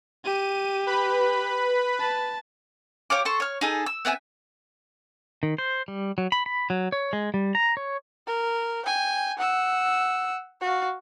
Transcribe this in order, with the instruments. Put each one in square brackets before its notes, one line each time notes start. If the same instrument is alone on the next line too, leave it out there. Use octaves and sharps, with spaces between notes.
[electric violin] G4 [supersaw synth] D#7
[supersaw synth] B4 B5
[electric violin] A5
[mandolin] G4 C#5 F5 D6
A4 C5 C#6
C#5 F6
D#4 G#4 A4
E6
B3 C4 E5 G#5
[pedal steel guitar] D#3
C5
G3
F#3
B5
B5
F#3
C#5
G#3
G3
A#5
C#5
[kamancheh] A#4
G5 G#5
F#5 E6
F#4 F5